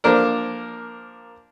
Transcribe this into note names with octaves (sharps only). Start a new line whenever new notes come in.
F3 A#3 D4 A#4